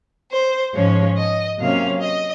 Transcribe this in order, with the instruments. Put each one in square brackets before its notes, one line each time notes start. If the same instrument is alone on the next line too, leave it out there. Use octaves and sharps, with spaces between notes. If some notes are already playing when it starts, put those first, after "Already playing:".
[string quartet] C5
G#2 F3 G#3 C#4 C#5
D#5
C3 F#3 A#3 C#4 F5
D#5